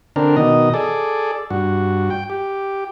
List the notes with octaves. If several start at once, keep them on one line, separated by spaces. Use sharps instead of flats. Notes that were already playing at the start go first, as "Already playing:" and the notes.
D3 C4 D4 A#4
B2 D#3 D#5
G#4 A4 D5
G2 F#4
G5
G4